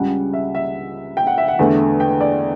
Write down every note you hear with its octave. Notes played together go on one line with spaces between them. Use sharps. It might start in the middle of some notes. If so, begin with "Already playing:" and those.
Already playing: C#2 C#3 G3 F#5
E5
E5
G5
F#5
E5
F#5
E2 D3 A3
G5
D5